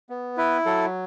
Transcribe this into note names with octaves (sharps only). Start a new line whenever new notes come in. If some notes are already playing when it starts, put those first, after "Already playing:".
B3
E4 B4
F#3 A4